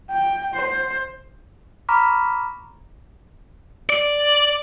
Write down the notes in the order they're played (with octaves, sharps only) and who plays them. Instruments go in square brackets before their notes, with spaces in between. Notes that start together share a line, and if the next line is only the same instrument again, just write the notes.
[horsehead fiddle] G5
C5
[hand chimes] A#5 B5 C#6 D6 F6 B6
[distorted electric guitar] D5